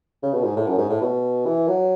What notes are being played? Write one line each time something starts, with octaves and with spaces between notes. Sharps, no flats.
C#3
B2
G#2
A2
F#2
G#2
A2
B2
E3
F#3